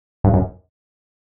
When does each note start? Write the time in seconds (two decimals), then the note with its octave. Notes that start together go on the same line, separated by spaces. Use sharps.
0.24 G2
0.34 F#2